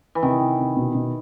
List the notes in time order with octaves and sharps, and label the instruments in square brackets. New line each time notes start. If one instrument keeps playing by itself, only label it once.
[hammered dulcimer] E3
[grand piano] C3 [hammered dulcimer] D#3
[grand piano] C3
C3
B2
B2